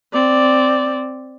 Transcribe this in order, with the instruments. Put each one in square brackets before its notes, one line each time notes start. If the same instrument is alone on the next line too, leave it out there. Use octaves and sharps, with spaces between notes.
[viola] C4 D5